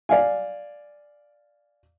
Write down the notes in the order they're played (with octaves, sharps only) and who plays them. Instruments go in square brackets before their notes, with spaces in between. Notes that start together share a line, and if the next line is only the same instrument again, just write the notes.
[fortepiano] D5 F5 G#5